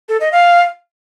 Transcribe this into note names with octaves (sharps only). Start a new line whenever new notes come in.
A4
D#5
F5